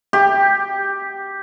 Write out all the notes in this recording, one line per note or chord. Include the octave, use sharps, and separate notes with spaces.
G4